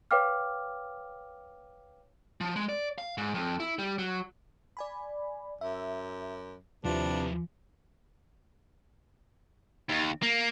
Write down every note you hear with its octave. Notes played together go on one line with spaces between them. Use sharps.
B4 C#5 F5 G5 D6 F6
F3
G#3
D5
F5
G#2
F2
E4
G3
F#3
D5 G#5 B5
F#2 E5
D#2 C3 F3 D4 E4 F4 B4
D#2
A#3